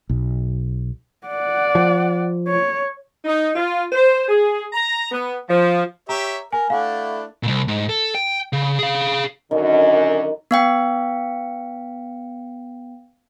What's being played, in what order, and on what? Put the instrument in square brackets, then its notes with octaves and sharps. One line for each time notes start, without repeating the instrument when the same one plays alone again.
[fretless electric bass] B1
[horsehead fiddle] D5 F#5
[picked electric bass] F3
[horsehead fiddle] C#5
[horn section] D#4
F4
C5
G#4
A#5
B3
F3
[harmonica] G4 C#5 E5 [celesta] A#5
[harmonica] A#4 [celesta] G#5
[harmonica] A3 D4 E4 [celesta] F5 F#5
[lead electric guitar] C2 A#2
G#2
A4
G5
C#3
G#4 F5
[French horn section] F#2 D3 [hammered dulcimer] D#3
[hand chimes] B3 F5 G5